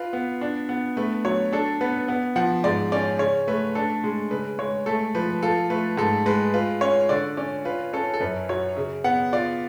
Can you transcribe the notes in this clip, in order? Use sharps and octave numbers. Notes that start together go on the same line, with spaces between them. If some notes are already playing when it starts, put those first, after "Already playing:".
Already playing: F4 B4
B3
D4
B3
A3 B4
F#3 C#5
D4 A4
B3 B4
B3
F3 F#5
G#2 D5
C#4 D5
C#3 C#5
A3 B4
D4 A4
G#3
C#3 B4
G#3 C#5
A3 A4
F3 B4
F4 A4
A3 B4
G#2 A4
G#3 B4
F4 B4
C#4 C#5
D3 D5
C#4 D5
F4 B4
C#4 A4
A4
F#2 B4
F#3 C#5
C#3
B3 F#5
F4 D5